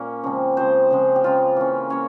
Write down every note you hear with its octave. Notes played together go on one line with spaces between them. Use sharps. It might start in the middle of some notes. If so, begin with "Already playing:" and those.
Already playing: A#2 A#3 C#4
C#3 F3 G#3 C4
C#3 F3 G#3 C4 C5
C#3 F3 G#3 C4
G4
C#3 F3 G#3 C4 F4
E3 A#3 C#4
A#3 C#4 C#5